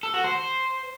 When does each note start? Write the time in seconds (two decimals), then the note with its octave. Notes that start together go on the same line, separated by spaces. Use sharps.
0.03 A4
0.14 F#4
0.24 C5